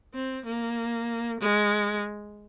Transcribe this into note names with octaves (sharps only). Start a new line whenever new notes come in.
C4
A#3
G#3